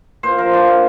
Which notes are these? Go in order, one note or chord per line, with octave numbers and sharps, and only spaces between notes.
A#2 C5
F3 A#4
F3 D4
A#2